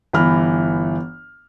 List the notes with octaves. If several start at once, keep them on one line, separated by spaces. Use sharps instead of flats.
G1 E3 B5 F6